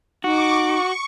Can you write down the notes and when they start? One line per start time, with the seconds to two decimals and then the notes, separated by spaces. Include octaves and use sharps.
0.24 D#4 F#4 C#6 D6
0.65 C#6